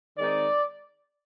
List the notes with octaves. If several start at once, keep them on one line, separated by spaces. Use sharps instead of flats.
D#3 G#3 C4 D#4 D5